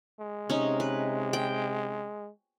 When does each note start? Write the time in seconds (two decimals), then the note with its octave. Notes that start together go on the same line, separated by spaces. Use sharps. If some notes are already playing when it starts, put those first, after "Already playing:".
0.20 G#3
0.50 C3 C#4 D#4
0.80 B4
1.33 G5